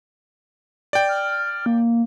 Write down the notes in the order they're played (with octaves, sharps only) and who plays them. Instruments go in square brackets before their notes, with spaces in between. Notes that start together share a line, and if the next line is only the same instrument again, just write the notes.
[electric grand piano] D5 G5
[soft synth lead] F6
A#3